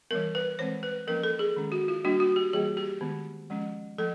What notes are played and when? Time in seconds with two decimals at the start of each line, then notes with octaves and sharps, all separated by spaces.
0.11 E3 G3 B3 A#4
0.35 B4
0.59 E3 G#3 C4 C5
0.83 B4
1.07 F3 A#3 C#4 A#4
1.23 A4
1.39 G#4
1.56 D#3 G#3 C#4
1.72 F#4
1.88 F4
2.04 G3 A#3 D4 F#4
2.20 F#4
2.36 G4
2.53 E3 G3 A#3 G#4
2.77 G4
3.01 D#3 G#3 B3
3.50 F3 G#3 C#4
3.98 F3 A3 A4